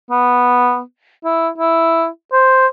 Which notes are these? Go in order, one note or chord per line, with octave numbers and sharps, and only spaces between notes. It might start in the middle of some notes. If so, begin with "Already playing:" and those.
B3
E4
E4
C5